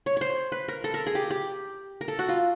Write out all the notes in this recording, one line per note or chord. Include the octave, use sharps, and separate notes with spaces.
C#5
C5 C#5
B4
A#4
A4
A#4
G#4
G4
G4
A#4
A4
F#4
F4